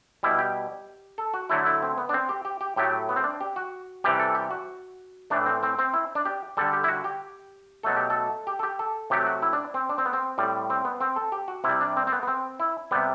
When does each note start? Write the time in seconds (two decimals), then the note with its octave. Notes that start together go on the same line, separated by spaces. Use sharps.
0.23 B2 G3 E4
0.39 G4
1.18 A4
1.34 F#4
1.49 D3 F#3 A3 E4
1.66 E4
1.82 C4
1.98 B3
2.09 D4
2.14 C4
2.29 G4
2.45 G4
2.61 G4
2.76 A2 F#3 A3 G4
3.09 B3
3.16 C4
3.24 D4
3.41 G4
3.56 F#4
4.04 C3 E3 G3 G4
4.20 A4
4.35 G4
4.51 F#4
5.30 A2 E3 A3 D4
5.46 C4
5.63 C4
5.79 C4
5.93 E4
6.15 D4
6.25 G4
6.57 D3 G3 A4
6.73 G4
6.84 E4
6.88 F#4
7.04 G4
7.83 B2 F#3 A3 A4
7.96 G4
8.10 A4
8.47 G4
8.59 A4
8.63 G4
8.79 A4
9.10 C3 F#3 A3 G4
9.27 F#4
9.42 E4
9.53 D4
9.74 C4
9.89 D4
9.98 C4
10.06 B3
10.13 C4
10.38 A2 G3
10.70 C4
10.85 B3
11.01 C4
11.16 A4
11.32 G4
11.48 F#4
11.64 C3 G3 E4
11.81 D4
11.97 C4
12.07 C4
12.12 B3
12.23 B3
12.28 C4
12.60 E4
12.91 C3 G3 B3